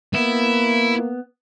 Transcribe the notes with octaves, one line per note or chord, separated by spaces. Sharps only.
A#3 B3 E4